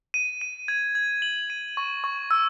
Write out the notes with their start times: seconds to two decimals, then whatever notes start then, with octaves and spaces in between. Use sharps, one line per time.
0.14 D#7
0.41 D#7
0.68 G#6
0.95 G#6
1.22 F#7
1.50 D#7
1.77 C#6
2.04 C#6
2.31 E6